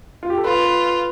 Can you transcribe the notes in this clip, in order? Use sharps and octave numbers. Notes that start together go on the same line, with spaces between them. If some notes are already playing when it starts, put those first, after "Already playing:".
F4
G4
A4
F4 B4
B4